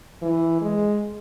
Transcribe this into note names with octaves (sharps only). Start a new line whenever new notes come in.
E3
G#3